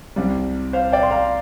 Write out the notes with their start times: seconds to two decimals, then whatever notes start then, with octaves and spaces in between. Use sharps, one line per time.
0.16 C2 C3 G3
0.73 C5 F5
0.92 D5 G5
1.03 C6
1.11 F5 A#5